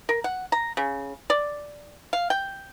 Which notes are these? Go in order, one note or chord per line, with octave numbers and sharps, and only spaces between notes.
A#4
F#5
A#5
C#3
D5
F5
G5